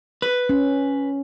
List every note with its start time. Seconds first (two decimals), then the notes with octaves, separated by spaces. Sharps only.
0.22 B4
0.49 C#4